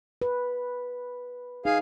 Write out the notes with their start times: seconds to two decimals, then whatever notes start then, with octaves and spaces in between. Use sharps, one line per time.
0.22 B4
1.65 D#4 G#4 F5